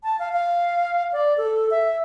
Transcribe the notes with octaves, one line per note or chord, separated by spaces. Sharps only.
A5
F5
F5
D5
A4
E5